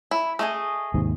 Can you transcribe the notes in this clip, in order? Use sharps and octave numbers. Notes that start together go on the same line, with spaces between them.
E4
A3 G#4 D#5 D#6
D#2 G#2 C3